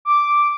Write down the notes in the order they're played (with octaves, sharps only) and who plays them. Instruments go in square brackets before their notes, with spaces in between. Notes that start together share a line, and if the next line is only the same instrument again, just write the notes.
[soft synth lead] D6